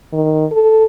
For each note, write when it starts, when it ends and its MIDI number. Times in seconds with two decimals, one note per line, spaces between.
0.13 0.45 51
0.52 0.84 69